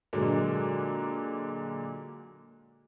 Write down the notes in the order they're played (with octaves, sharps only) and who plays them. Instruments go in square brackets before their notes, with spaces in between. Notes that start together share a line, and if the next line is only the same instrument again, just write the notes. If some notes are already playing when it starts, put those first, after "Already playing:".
[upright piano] A#2 D3 F#3 G#3 A#3